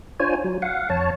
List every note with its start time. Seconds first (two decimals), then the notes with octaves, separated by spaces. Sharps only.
0.20 D4 F4 C5 C#5 G#5
0.44 F#3
0.62 F5 F#5
0.90 F2 C#5 A5